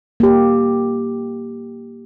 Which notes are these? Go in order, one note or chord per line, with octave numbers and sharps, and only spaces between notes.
A#3 G4